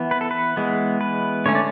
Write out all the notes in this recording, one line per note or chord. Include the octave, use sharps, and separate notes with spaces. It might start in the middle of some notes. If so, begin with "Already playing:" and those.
Already playing: E3 B3
B4
A4
B4
E3 G#3 B3
B4
D3 A3 C#4 C#5
D5